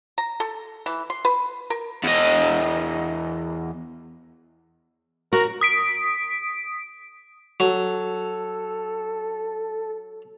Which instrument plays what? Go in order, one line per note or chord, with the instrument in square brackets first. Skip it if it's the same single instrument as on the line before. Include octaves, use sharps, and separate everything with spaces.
[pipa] A#5
A4
E3
C6
B4
A#4
[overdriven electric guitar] E2 D#5
[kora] F#4 [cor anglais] A#4
[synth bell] D#6 B6 D7
[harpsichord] F#3 [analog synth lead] A4